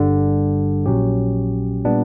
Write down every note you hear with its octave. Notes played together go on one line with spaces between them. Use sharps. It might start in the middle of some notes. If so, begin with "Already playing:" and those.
Already playing: G1 G2 D3 G3
A#1 A#2 F#3 C#4 G4
A#2 G3 B3 D4